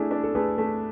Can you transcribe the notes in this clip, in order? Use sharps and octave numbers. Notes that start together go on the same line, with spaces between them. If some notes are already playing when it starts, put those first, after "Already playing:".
Already playing: A3 D4 E4 G#4
D4
A4
A3 G#4 B4
A3